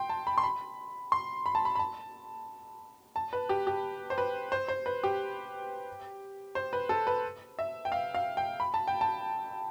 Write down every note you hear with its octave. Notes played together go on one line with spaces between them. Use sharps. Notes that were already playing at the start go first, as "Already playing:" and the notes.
Already playing: G5 C6
A5
B5
C6
B5
C6
B5
A5
B5
B5
A5
A5
B4
G4
G4
C5
B4
C5
C5
B4
G4
C5
B4
A4
B4
E5
G5
F5
F5
G5
B5
A5
G5
A5